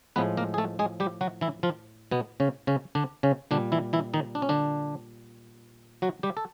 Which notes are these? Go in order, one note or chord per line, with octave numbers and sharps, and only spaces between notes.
A2 F3 G#3 B3 B4
A#3 A#4
G#4
A3 A4
G#3 G#4
G3 G4
F#3 F#4
E3 E4
F3 F4
B2 B3
C#3 C#4
C#3 C#4
D3 D4
C#3 C#4
A#2 D3 G3 D4
E3 E4
E3 E4
D#3 D#4
D4
C#4
D3 D4
F#3 F#4
G3 G4
A4